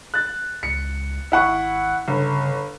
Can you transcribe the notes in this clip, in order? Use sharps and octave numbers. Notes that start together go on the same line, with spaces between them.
F#6 A6
C#2 C#7
G#1 E4 F#5 C#6
G1 C#3